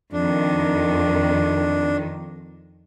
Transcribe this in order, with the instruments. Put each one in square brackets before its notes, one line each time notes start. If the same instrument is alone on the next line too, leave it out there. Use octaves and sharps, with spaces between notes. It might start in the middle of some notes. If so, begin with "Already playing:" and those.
[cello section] F2 D#3 [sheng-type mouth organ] D4